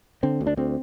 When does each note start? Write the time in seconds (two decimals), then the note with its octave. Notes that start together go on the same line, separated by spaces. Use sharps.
0.23 D3 C4
0.41 D2
0.47 D4
0.57 D2 C4